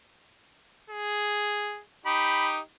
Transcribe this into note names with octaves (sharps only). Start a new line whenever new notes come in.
G#4
D#4 G4 B5